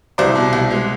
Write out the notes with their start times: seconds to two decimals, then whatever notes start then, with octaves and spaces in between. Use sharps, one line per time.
0.18 C2 C5 D5
0.35 B2
0.53 C2
0.71 G#3